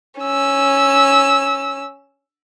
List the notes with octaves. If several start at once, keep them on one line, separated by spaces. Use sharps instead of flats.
C#4 E6